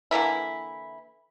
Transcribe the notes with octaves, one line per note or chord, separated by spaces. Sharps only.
D3 E3 A#3 E4